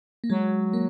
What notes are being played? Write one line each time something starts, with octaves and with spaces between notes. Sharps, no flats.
A#3
F#3 G#3
A#3